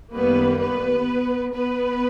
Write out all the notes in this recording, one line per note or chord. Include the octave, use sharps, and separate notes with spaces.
F#2 D#3 G3 A#3 B3 B4
B3 B4
B3 B4